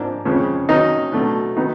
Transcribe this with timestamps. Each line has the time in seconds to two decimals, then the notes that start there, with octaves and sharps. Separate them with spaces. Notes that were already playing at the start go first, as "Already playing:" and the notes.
Already playing: G#2 F3 A#3 D4
0.25 F2 C#3 F3 G#3 C#4
0.69 D#3 F#3 A#3 C#4 D#4 D#5
1.12 B2 F#3 A3 D4
1.56 D#3 F#3 B3 D#4